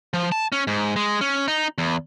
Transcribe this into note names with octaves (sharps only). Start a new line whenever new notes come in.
F3
A5
C#4
G#2
G#3
C#4
D#4
E2